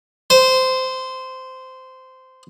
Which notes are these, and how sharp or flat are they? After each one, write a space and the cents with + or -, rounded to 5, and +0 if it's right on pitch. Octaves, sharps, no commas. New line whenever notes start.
C5 -15